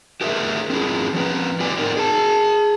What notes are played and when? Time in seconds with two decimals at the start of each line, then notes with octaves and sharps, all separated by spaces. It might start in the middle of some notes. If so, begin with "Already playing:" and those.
0.21 G4 G#4 A#4 C5 E5
0.70 C4 C#4 E4 G#4
1.14 F3 C4 B4
1.60 G4 D5 G5 G#5
1.78 B3 C4 D#4 A#4 C5 D5
1.97 G#4 A5